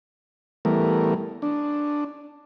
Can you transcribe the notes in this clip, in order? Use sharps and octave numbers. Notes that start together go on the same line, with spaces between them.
E3 G3 A3 B3 A#4
D4